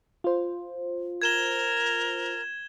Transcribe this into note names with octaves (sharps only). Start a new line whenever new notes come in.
F4 C5
A#4 G#6 E7 G7